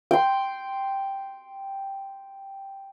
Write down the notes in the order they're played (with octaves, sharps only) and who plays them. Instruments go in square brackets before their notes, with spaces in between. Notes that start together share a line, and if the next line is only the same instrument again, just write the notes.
[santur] G5 C6